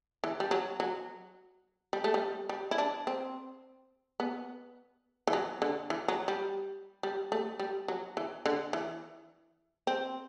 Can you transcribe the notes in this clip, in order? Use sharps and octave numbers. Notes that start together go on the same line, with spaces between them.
E3
G3
F#3
F#3
G3
A3
G3
G3
E4
D4
C4
B3
E3
F#3
D3
E3
F#3
G3
G3
A3
G3
F#3
E3
D3
E3
C4